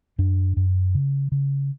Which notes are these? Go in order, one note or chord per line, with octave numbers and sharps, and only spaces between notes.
F#2 D4
F#2
C#3
C#3